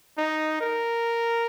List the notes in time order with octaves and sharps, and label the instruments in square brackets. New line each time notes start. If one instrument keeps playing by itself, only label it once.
[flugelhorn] D#4
A#4